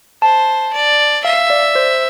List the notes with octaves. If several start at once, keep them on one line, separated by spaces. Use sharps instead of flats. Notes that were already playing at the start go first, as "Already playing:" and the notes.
C5 A5
D5
E5 F5
D5
C5